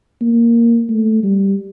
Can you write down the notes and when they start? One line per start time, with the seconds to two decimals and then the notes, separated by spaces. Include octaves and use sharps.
0.21 A#3
0.89 A3
1.24 G3